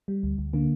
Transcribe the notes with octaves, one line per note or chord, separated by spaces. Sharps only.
G3
D2
D2
D3 A#3